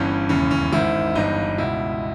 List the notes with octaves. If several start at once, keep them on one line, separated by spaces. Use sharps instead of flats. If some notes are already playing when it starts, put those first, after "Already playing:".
Already playing: G1 G2 E3 C#4
E1 D#2 C#3 E3 C#4
C#4
G#1 G#2 D#3 E4
G1 G2 E3 D#4
C#2 B2 E4